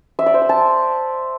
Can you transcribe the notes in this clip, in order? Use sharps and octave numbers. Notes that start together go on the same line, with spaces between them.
E5
D5
C5
E6
A5